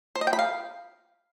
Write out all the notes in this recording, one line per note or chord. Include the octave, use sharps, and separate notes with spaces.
C5
D#5
G5
B5
F5